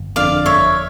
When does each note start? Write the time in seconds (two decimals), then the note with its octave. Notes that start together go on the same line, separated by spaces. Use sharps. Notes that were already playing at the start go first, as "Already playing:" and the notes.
Already playing: G1
0.16 F2 D3 D5 F5
0.46 G1 C#5 E5